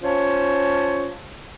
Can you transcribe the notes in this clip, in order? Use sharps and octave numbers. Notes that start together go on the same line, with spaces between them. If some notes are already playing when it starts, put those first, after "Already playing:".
C#4 F4 C5 C#5 A5